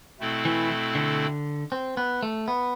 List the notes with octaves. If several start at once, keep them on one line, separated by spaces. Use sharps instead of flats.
B2 A3 C4 E4 A4
E3
D3
C4
B3
A3
B3